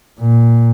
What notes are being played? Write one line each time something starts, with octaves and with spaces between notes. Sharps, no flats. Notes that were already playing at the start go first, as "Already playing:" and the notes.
A#2